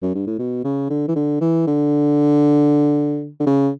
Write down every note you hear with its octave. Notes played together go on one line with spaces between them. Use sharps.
F#2
G2
A2
B2
C#3
D3
E3
D3
E3
D3
D3
C#3